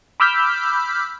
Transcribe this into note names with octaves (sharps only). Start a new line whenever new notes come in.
B5 D6 E6 F6 G6 B6